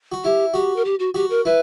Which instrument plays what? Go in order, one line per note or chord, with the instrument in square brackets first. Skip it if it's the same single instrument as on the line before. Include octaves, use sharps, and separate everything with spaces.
[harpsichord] F#4
[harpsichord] E4 [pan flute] G4
[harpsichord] F#4 [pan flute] G4
[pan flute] A#4
G4
F#4
[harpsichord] F#4 [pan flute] G4
[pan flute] A#4
[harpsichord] E4 [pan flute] B4